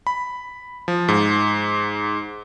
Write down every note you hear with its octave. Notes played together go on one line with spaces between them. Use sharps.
B5
F3
G#2